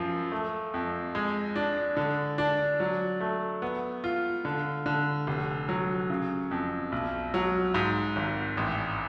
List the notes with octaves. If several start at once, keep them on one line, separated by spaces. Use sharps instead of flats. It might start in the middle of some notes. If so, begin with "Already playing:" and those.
Already playing: F#2 F3
A3
F2
G#3
D4
D3
D4
F#3
A3
B3
F4
D3
D3
F1
F#3
C#3
F2
B1
F#3
G#2
G#1
A1